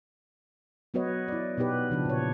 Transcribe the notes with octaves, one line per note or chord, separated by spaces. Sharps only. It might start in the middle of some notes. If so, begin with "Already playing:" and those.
F#3 B3 F#4 B4 C#5 D#5
E4 D5
B2 B3 D#4 G4 B4
C#3 F3 D4
A#2 C#5